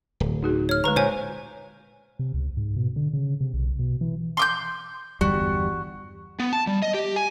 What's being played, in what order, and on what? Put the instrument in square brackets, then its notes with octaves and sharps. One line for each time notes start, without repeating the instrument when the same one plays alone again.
[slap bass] D1
[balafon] D#4 F#4 G#4
[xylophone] C#5 F6
[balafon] D3 G#3 [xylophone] B4 A#5
[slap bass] A#2 [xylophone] C5 C#5 G#5
[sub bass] C3
C#2
G#2
B2
D3
C#3
C3
B1
B2
E3
[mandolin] C6 D6 G6
[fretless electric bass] G1 E2 G3 [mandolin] F#4
[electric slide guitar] B3
A5
G3
D#5
G4
G#5